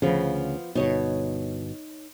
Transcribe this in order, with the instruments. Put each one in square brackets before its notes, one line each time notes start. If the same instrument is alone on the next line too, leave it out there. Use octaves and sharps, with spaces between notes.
[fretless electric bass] D2 C#3 [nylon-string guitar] F3 B3
[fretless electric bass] G1 B2 [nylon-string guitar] D#4 C#5